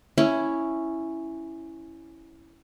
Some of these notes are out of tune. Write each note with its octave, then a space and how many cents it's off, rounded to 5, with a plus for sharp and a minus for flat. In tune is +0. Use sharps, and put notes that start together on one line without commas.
C#4 +0 E4 +0